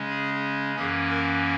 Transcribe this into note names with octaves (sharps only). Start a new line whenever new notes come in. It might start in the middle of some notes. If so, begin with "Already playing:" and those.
Already playing: C#3 G#3 C#4
G#4
F#2 E3 A#3 C#4 G#4
A#4